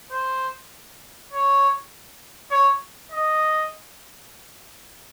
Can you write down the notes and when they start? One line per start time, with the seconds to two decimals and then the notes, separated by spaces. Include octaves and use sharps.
0.12 C5
1.32 C#5
2.51 C#5
3.12 D#5